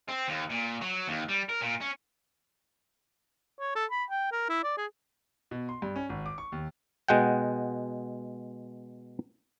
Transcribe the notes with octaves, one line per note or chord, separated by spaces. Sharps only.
C4
D#2
A#2
F#3
D#2
G3
A#4
A#2
C#4
C#5
A4
B5
G5
A#4
E4
D5
G#4
B2
C6
G2
C#4
G#1
D6
C#6
D#2
B2 G#3 F#5 G5